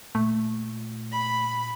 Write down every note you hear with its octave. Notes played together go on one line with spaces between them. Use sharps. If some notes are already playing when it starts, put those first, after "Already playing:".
A#2 A3
B5